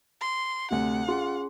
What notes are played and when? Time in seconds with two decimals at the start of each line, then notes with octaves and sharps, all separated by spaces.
0.21 C6
0.70 D2 C3 F#5
1.08 C#4 F4 G#4 C6